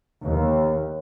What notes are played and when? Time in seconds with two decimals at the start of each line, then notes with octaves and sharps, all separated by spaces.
0.23 D#2